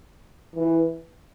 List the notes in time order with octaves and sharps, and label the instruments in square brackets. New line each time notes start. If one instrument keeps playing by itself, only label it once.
[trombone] E3